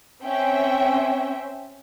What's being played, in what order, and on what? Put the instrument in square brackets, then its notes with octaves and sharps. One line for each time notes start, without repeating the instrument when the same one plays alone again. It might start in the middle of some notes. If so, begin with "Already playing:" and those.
[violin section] C4 C#4 E5 G5